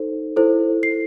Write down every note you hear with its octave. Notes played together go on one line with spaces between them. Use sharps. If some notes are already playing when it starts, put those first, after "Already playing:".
Already playing: D#4 A4 C5
E4 A4 C5
C7